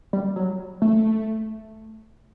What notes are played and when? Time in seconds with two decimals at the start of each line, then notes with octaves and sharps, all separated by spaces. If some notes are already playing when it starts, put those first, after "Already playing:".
0.13 G3
0.36 F#3
0.82 A3